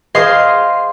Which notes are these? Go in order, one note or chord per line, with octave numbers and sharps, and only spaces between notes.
G#4 C5 D#5 F5 C6 D#6